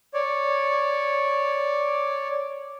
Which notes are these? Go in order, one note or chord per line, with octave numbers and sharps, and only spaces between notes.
C#5 D5